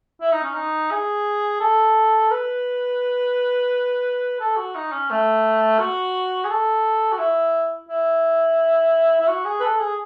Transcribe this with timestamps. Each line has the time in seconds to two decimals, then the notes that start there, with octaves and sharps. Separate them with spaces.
0.21 E4
0.32 D#4
0.44 C#4
0.54 D#4
0.91 G#4
1.60 A4
2.31 B4
4.40 A4
4.57 F#4
4.75 D#4
4.92 C#4
5.10 A3
5.80 F#4
6.44 G#4
6.50 A4
7.12 F#4
7.19 E4
7.89 E4
9.20 E4
9.28 F#4
9.45 G#4
9.60 B4
9.63 A4
9.80 G#4